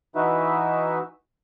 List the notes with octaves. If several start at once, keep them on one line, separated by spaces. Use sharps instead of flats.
E3 D#4 E4 F#4 B4 E5